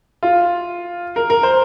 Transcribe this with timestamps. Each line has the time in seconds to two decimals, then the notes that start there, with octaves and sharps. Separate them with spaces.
0.23 F4
1.16 A#4
1.30 A#4
1.43 C5